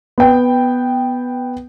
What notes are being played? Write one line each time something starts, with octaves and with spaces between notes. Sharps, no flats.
B3 G5